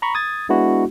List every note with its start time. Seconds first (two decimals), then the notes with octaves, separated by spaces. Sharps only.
0.02 A#5 B5 C#6
0.15 D#6 G#6 A6
0.49 G#3 B3 D4 E4 F#4